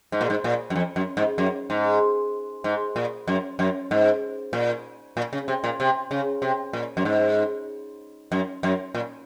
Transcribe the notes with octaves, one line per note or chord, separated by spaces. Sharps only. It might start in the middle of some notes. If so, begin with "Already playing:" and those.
G#2
A#2
G#2
A#2
F#2
F2
F#2
G#2
F#2
G#2
G#2
A#2
F#2
F#2
G#2
A#2
A#2
C#3
C3
A#2
C3
C#3
C3
A#2
F#2
G#2
F#2
F#2
A#2